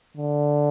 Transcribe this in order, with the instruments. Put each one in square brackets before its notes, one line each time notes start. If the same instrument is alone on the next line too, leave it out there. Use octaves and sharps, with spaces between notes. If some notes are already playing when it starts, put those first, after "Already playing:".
[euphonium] D3